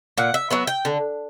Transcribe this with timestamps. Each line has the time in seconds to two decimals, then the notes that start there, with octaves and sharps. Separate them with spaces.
0.18 A#2 F#5
0.34 E5
0.51 F#3 B3 E5
0.67 G5
0.85 D3